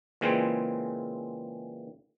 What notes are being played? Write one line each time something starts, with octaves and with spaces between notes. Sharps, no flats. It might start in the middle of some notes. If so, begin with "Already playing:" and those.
A#2 C#3 E3 G#3 C4